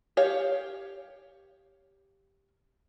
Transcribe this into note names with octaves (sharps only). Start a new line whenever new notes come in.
G4 C#5 F5